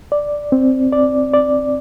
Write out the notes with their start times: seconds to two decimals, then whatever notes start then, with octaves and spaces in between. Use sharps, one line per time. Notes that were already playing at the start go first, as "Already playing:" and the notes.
0.12 D5
0.52 C4
0.92 D5
1.34 D5